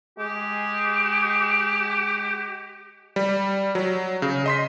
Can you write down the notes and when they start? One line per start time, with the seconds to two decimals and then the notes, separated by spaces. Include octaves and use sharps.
0.18 G#3 G4
3.16 G3
3.75 F#3
4.22 C#3
4.46 D#5 C6 B6